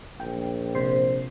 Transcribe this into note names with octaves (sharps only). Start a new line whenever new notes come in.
A#1 G5
C3 C5 C7